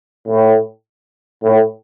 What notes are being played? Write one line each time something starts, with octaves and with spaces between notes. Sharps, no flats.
A2
A2